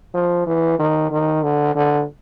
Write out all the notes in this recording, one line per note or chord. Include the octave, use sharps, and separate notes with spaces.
F3
E3
D#3
D#3
D3
D3